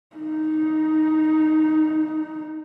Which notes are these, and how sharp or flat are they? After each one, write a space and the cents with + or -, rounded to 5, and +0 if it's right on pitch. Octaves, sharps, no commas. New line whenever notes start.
D#4 +0